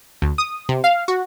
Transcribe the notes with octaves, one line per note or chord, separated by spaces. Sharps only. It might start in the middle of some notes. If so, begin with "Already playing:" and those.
D2
D#6
C3
F5
F#4